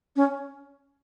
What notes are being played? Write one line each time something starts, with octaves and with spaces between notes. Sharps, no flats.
C#4